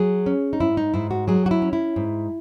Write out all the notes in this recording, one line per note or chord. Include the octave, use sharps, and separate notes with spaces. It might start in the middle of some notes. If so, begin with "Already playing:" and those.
Already playing: F#3 G#4
C#4
D#4
G#2 E4
D#4
G#2 E4
F#4
F#3 G#4
F#4
E4
C#4
E4
G#2